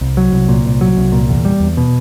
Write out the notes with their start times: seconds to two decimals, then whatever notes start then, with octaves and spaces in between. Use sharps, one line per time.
0.01 C2
0.17 F#3
0.32 C2
0.49 A#2
0.65 C2
0.81 F#3
0.97 C2
1.12 A#2
1.29 E2
1.45 G3
1.60 E2
1.77 B2